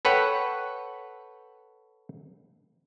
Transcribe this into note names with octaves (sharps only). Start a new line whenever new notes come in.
A4 B4 C#5 F#5 G5